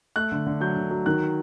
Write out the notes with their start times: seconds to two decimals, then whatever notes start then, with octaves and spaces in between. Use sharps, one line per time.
0.16 A3 F#6
0.32 D3
0.47 D3
0.61 F#3 G6
0.76 D3
0.91 F#3
1.06 D#3 F#6